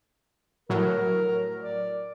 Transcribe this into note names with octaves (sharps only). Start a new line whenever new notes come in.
A2 F#3 A#4
D5